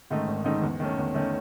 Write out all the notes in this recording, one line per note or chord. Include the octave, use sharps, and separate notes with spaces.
G#2 D#3 A3 D#4
G#1
G#2 D#3 A3 D#4
E2
D#3 A3 C#4
E2
D#3 A3 C#4